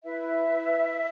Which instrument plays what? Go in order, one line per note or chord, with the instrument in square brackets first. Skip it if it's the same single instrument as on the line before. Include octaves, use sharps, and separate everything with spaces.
[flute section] E4 B4 E5